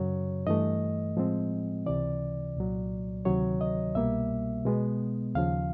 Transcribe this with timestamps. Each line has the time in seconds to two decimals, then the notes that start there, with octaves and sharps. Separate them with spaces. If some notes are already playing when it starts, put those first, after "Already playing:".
Already playing: F#2 C#3 F#3 C#5
0.47 G2 E3 A3 D#5
1.17 A2 F3 G#3 C4
1.86 C#2 C3 E3 D5
2.57 C2 A#2 F#3
3.25 D2 C3 D#3 F#3 C#5
3.61 D#5
3.95 C2 B2 G3 A#3 E5
4.65 B2 G#3 B3
5.35 D#2 C#3 F3 F5